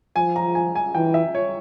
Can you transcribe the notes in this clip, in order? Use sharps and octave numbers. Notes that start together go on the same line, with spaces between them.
F3 G#5
A#5
G#5
G#5
E3 G5
E5
C#5